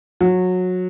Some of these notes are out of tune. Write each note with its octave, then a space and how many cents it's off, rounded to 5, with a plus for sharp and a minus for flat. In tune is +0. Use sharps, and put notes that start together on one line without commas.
F#3 -20